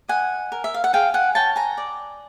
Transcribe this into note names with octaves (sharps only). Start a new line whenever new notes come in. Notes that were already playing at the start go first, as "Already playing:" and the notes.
D#5 F#5 G#5
A#4
E5
F5
F#5
G#4 F5 G5
F#5 G#5
C#5 G5 A5
G#5 A#5
D5